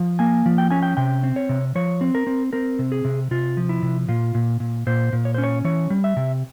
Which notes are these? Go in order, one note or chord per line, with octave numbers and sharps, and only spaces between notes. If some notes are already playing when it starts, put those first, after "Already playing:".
Already playing: F3
A#3 G#5
F3
G5
C#4 G#5
G5
C3 G5
C4
C#5
C3
F3 C#5
C4
A#4
C4
C4 A#4
C3
G#4
C3
C3 F4
F3
E4
C3
A#2 F4
A#2
A#2
A#2 C5
A#2
C#5
C#4 C5
C#5
E3 C#5
G3
E5
C3